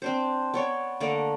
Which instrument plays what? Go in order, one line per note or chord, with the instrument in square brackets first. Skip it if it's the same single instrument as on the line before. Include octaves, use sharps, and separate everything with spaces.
[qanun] C4 D4 C5
B3 C#5 D5
D3 A3 A#3 D5